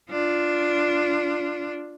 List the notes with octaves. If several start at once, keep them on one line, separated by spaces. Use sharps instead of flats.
D4 F4